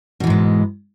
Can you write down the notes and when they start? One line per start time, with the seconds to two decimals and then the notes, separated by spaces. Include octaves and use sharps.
0.20 B2
0.24 E3
0.27 G#2
0.30 G#3